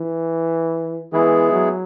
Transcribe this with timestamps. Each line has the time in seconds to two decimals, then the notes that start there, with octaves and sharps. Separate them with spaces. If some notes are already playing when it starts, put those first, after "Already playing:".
Already playing: E3
1.13 E3 G#3 B3 E4 G#4
1.53 F#3